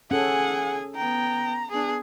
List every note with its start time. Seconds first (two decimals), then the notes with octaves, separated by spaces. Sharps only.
0.11 C#4 G#4 A4 F#5 G#5
0.95 B3 G5 A#5
1.71 B3 D4 G#4